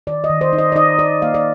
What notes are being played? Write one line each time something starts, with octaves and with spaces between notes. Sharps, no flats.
D#3 D5
D#5
D#3
C5
D#4
D#5
D5
D#4 D#5
D#3 D5
A#3 F5
D5